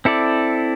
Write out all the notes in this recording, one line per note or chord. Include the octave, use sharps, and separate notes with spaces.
C4 E4 A4 D5